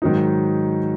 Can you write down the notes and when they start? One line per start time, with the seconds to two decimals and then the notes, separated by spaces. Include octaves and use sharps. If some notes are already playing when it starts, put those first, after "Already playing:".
0.02 G#2 D#3 F#3 D#4